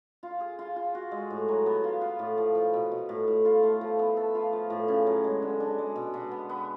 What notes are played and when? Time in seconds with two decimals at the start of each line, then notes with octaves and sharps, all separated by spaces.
0.23 F4
0.40 G#4
0.59 F4
0.76 F4
0.95 F#4
1.11 G#3
1.30 A2
1.49 F#3
1.66 B3
1.84 F4
2.01 F4
2.19 A2
2.38 F3
2.55 F3
2.73 B2
2.92 B2
3.09 A2
3.28 A2
3.45 F4
3.63 A3
3.81 F3
3.99 B3
4.17 A4
4.35 F4
4.53 F3
4.70 A2
4.88 C#3
5.07 F#3
5.24 G#3
5.42 D3
5.60 D4
5.78 G#3
5.96 B2
6.14 B2
6.31 B3
6.49 B3